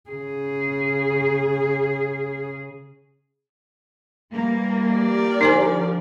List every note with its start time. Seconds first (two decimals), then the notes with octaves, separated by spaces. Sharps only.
0.10 C#3 G#4
4.32 E3 G3 A#3
4.94 G4 A#4 D5
5.41 D3 F3 D#4 C5 G#5